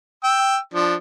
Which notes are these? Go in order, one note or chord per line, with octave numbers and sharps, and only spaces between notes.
G5 E6
F3 D4